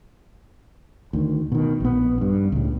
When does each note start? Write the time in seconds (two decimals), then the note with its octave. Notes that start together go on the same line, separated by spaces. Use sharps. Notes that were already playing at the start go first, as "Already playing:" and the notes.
1.13 D2 D#3
1.52 B2 D#3
1.80 A#1 B3
2.21 G2
2.52 C#2 A2